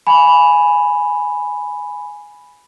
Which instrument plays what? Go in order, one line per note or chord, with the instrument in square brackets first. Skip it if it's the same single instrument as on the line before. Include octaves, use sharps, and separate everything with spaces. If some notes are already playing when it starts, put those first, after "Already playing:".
[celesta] G#5 B5